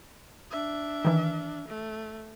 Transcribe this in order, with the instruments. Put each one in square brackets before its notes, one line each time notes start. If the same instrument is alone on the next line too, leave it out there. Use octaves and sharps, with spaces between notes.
[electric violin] D4 E5
[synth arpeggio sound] D#3 E3
[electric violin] A3